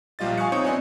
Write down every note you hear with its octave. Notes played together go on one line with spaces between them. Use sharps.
A#1 F3 G3 F4 D#5 A6
F5 G#5 C#6 D#6 F#6 C#7
C4 D#4 C#5 C#6 D#6
B3 C4 D4 D#5 G#5